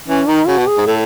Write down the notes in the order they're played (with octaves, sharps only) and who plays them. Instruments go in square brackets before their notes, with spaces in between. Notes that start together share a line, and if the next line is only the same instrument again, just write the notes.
[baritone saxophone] E3 [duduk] C#4
[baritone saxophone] D#3 [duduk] D#4
[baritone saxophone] C#3 [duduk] F#4
[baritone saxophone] B2
[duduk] G#4
[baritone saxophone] G#2
[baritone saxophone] A2 [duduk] A4